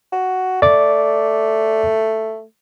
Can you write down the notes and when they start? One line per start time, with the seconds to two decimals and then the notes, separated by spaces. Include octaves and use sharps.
0.13 F#4
0.62 A3 D5 D6